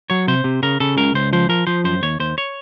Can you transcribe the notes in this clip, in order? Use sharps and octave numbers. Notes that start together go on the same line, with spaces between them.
F#3 C#5
C3 C5
C3
C#3 A#4
C#3 A4
C#2 A#4
C#2 C5
F3 C5
F3 A#4
F3 C5
F#2 C5
D#2 C#5
D#2 C5
C#5